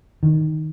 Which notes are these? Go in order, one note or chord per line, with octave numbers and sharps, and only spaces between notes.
D#3